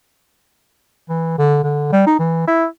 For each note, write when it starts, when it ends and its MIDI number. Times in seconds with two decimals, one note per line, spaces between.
1.09 1.38 52
1.38 1.59 50
1.64 1.92 50
1.92 2.03 55
2.06 2.15 63
2.19 2.44 52
2.47 2.66 64